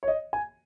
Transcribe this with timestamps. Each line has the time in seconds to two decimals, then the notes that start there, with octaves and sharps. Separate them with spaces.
0.03 C#5
0.08 D#5
0.33 G#5